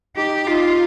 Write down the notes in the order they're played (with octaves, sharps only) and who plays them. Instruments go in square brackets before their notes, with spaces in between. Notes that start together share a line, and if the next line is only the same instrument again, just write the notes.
[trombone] D#4 [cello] G4
[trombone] D#4 [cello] F4